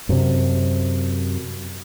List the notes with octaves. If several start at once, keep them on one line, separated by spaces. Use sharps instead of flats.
F#2 C3